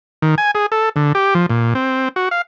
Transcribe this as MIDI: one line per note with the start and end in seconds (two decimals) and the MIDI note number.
0.22 0.35 51
0.38 0.51 80
0.55 0.66 68
0.72 0.89 69
0.96 1.13 50
1.15 1.34 67
1.35 1.46 53
1.50 1.74 46
1.75 2.09 60
2.16 2.29 66
2.31 2.42 77